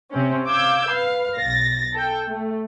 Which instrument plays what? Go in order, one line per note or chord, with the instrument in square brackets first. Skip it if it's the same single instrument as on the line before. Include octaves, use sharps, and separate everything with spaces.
[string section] C3 C4 C#4
F5 D6 E6 G6 G#6
B4 F5
B1 A6 A#6
A4 G5
A3